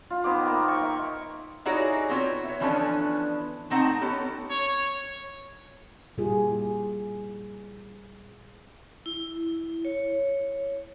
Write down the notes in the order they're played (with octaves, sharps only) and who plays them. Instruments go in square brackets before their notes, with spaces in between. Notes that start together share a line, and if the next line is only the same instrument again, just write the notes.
[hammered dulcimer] F4
D#3 B3 C5 D6
A#3
G5 C#6
E5
[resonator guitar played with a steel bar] D#4 E4 F#4 G#4 C#5 D5
B3 C4 F4 F#4 C#5
C#5 E5
E3 F3 B3 C#4 D4 A4
A3 C4 D#4 F#5 A5
B3 C#4 G4 A4
[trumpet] C#5
[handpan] A#2 G3 E4 F4 G4 G#4
[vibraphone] E4
C#5